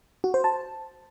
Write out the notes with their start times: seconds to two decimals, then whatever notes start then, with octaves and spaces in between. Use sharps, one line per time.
0.24 F#4
0.34 C5
0.44 A5